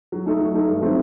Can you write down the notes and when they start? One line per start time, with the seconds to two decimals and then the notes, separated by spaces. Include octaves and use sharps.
0.12 F#3
0.26 A3 D#4 A4
0.40 F#3
0.54 A3 D#4 A4
0.68 G2
0.81 D#3 F#3 A3 C4